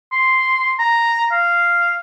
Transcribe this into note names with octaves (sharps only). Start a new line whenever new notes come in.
C6
A#5
F5